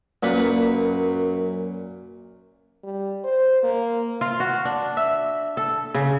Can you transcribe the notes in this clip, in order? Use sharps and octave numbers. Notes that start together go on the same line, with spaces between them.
F#2 A#2 B4
G3
C5
A#3
F4
F#4
D4
E5
A4
C#3